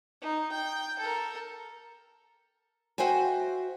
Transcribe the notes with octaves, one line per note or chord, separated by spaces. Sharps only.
D#4
G5
A4 A#4
F#4 C5 E5 G5 G#5